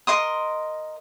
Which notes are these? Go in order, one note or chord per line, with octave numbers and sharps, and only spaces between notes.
A#4 D#5 C6 D#6